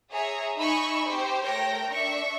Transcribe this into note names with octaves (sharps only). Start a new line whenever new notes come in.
G#4 C#5 E5 A#5
D#4 D#5 E5 G#5 B5 C#6
C4 G4 C5
A3 A#4 C#5 G5 A#6
D4 E5 C#6